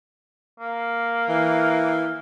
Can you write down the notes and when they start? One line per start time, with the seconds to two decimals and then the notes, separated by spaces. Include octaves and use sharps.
0.60 A#3
1.29 E3